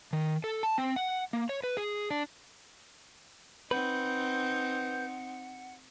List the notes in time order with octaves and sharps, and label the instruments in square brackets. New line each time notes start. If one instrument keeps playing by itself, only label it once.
[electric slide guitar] D#3
A4
A5
C4
F#5
A#3
C#5
B4
G#4
D4
[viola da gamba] C4 D#4 [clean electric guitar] B4 [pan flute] F#5 [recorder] G6